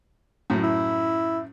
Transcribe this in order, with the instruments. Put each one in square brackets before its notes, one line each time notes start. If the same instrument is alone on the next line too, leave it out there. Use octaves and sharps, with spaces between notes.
[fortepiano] F#2 A2
[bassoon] E4